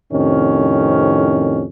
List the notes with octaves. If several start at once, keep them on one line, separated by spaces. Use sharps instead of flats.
F2 A2 C3 D#3 C#4